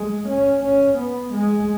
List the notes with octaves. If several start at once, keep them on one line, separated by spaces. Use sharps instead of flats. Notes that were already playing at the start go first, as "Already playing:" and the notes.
Already playing: G#3
C#4
C#4
B3
G#3